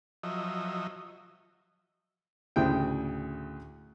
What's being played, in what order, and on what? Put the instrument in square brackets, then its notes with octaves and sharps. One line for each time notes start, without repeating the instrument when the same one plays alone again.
[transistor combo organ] F3 F#3 D#5 E5
[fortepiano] D2 A2 C#3 G5